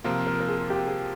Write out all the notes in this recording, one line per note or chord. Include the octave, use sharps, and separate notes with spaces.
C3 F3 A#3 F4 A#4
A#4
A#4
G#4
G4
G#4